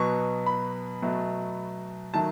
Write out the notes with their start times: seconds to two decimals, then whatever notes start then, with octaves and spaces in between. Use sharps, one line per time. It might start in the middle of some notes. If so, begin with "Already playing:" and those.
Already playing: B2 F#3 B3 C#6
0.46 B5
1.02 B2 F#3 A3
2.14 D#3 F#3 A3 A5